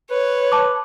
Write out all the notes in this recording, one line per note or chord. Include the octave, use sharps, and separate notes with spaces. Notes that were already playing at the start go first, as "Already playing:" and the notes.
B4 C#5
A5 D6